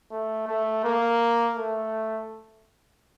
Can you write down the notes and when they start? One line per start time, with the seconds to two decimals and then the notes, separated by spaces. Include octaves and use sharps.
0.11 A3
0.47 A3
0.84 A#3
1.57 A3